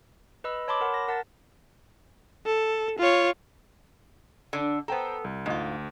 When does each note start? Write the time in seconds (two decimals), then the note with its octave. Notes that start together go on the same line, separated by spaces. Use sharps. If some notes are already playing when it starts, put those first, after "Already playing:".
0.44 B4 D#5 B5 E6
0.68 C#5 A5 B5 C6 D6
0.81 A#4 F#5
0.94 A#6
1.08 A#4 F#5 A5 A6
2.46 A4
2.99 F4 C#5
4.53 D3 D4
4.88 B3 A4 C5 G5 A#5
5.24 C2
5.46 D2 G#2 F4